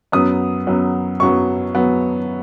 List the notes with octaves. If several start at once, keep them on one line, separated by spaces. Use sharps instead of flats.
F#2 F#3 B3 D#6
F#2 F#3 B3
F#2 F#3 B3 C#6
F#3 B3